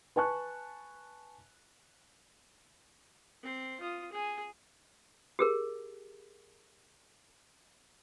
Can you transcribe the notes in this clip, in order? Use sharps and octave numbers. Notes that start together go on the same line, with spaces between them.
B4 G#5 A5 C#6 F#6
C4 C5
F4 D#6
G#4 G#5
G4 G#4 A#4